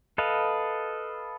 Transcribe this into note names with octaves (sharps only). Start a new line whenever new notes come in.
A4 B4 D#5 F5